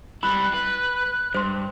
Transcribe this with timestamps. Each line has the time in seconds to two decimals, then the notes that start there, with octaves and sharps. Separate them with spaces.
0.23 G3 E4 B5 F#6
0.54 B4
1.34 G2 C5 C6